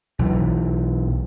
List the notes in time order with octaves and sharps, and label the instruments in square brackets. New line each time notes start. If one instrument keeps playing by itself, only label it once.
[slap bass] B1 E3